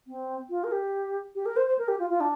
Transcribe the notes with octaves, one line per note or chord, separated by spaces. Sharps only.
C4
F4
A#4
G4
G4
A#4
C5
C5
A#4
G4
F4
F4
D4